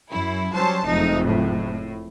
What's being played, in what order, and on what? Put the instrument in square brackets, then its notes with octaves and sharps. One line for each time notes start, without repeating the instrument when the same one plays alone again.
[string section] F#2 E4
[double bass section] F#3 G3 C#4 [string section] C5 A5
[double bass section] F#1 F2 A3 [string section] D#4
[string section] A2